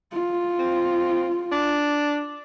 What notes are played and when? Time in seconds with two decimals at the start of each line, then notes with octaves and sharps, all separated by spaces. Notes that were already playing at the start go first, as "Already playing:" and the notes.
0.13 F4
0.59 C4
1.52 D4